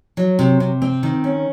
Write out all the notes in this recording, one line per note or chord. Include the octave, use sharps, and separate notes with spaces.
F#3
C3
C3
C4
D#3
C#4